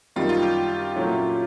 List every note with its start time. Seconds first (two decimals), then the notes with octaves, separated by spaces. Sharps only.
0.16 F#2 D#3 G3 A#3 D#4 F4
0.29 F4
0.43 G4
0.95 A#2 F#3 A3 C#4 E4